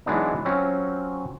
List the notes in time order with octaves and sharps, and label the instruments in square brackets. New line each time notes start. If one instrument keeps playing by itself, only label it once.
[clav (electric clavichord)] E3 F#3 G#3 B3 D4 D#4
F#3 C4 C#4 F4